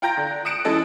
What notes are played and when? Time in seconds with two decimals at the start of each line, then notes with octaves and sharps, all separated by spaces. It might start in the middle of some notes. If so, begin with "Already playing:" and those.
0.02 F4 G5 A#5 G6 A#6
0.17 D3
0.45 D#6 F#6 C#7 D7 E7
0.65 E3 G#3 C#4 A4 D#5